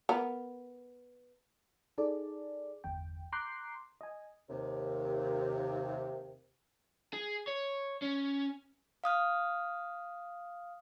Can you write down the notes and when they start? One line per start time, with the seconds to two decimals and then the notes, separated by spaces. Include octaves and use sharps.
0.09 B3 A#4
1.98 D#4 G#4 A4 D5
2.84 G1 E2 G5
3.32 A#5 C6 D6 F#6 G6 C7
4.01 D#5 G#5
4.49 D#2 C3
7.13 G#4
7.47 C#5
8.02 C#4
9.04 F5 D#6 F6